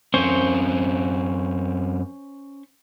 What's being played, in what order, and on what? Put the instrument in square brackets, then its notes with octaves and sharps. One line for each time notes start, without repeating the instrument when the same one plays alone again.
[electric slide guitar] F#2 C4 [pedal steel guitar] C#4 C5 C#6